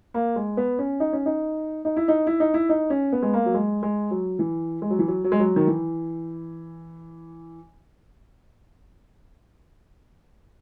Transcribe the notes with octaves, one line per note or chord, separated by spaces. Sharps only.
A#3
G#3
B3
C#4
D#4
C#4
D#4
D#4
E4
D#4
E4
D#4
E4
D#4
C#4
B3
G#3
A#3
F#3
G#3
G#3
F#3
E3
G#3
F#3
E3
F#3
F#3
G#3
F#3
D#3
E3